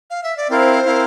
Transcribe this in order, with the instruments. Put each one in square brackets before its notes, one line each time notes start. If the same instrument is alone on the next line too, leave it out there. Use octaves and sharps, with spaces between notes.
[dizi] F5
E5
D5
[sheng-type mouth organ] C4 E4 A#4 F5 [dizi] C5
[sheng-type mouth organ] C4 E4 A#4 F5